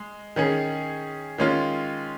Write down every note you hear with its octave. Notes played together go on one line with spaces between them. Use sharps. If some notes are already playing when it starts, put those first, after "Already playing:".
Already playing: G#3
D#3 C#4 G#4
D#3 G#3 C#4 F4